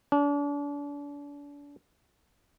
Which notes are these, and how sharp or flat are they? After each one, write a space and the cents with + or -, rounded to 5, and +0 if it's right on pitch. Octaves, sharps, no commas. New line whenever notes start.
D4 -35